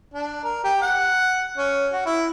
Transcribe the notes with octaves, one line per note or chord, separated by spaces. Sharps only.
D4
A#4
G4
F#5
C#4
F#4
E4